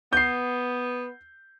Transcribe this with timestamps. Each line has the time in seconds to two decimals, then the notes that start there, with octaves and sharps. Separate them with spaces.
0.13 B3 G6 C7